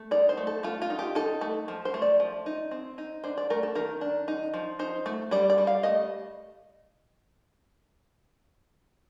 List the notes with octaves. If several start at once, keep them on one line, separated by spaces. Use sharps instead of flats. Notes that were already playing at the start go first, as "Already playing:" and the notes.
Already playing: A3
D#4 D5
C5
A3
A4
A3 F4
F4
D#4
G4
D#4 A4
A3
F3
C5
A3
D5
F3
D#4
C4
D#4
D4 C5
D5
A3 A#4
A4
D#3 A#4
D4
D#4
F3
D#4 C5
A3
G3 D5
D5
G3
F5
A3 D#5